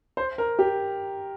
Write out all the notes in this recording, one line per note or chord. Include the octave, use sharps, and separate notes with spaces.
C5
A#4
G4